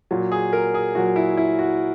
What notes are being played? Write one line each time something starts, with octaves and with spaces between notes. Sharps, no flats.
A#2 F#3
G#4
A#4
G#4
A#2 F#3 F#4
E4
E4
F#4